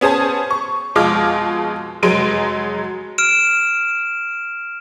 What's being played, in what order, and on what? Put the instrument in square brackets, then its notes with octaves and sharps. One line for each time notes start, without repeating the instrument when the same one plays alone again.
[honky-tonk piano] B3 C#4 G#4 C5 A5
C#6
F2 B2 G#3 F4 D6 F6
F1 F#3 G#3 C6 D7 D#7
[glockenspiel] F6 D7 E7